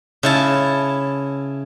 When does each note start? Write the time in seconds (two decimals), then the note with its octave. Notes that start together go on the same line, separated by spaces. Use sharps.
0.23 C#3 E4 A5